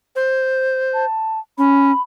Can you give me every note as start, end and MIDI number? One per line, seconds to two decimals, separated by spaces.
0.16 1.05 72
0.94 1.39 81
1.58 1.92 61
1.58 2.01 83